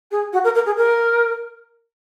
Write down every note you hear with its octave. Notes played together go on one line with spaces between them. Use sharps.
G#4
F#4
A#4
A#4
G#4
A#4